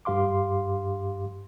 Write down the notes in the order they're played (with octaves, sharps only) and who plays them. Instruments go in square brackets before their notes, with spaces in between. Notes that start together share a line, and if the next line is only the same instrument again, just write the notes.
[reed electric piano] G2 G4 F5 C6 D6